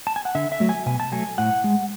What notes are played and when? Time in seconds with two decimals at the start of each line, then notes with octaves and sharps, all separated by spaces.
0.07 A5
0.16 G#5
0.25 F#5
0.35 D3 E5
0.52 E5
0.60 F#3 A3
0.69 G#5
0.86 B2 G#5
1.00 A5
1.12 F#3 A3 G#5
1.38 A2 F#5
1.64 G#3